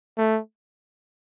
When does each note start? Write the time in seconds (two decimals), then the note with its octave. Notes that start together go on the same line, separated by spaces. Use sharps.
0.18 A3